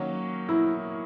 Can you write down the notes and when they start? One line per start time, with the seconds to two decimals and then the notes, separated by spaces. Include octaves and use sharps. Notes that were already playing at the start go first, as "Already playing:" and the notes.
Already playing: D#3 F#3 A#3 C#4 F#4
0.49 E4